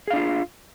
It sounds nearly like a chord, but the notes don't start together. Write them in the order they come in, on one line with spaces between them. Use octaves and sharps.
G#4 F5 D4 F4